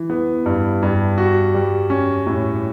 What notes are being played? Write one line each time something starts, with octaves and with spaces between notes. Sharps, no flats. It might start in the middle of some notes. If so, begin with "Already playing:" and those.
Already playing: E3
B3
G2
G2
F#4
G3
C#4
A2